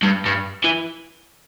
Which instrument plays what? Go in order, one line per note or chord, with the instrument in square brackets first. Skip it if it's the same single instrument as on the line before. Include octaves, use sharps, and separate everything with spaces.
[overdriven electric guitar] G2
G2
E3